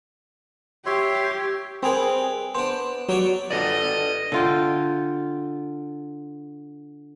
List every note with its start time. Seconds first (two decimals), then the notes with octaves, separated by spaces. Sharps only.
0.86 G4 C#5 E5 C6
1.83 G3 C4 G#4 A#4 B4
2.55 B3 D4 C5
3.09 F#3 G4 C#5 D5
3.51 A4 B4 D5 D#5
4.32 D3 F4 G5